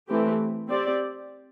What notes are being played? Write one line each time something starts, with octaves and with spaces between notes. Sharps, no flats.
E3 A3 C4 G4
C4 G4 D5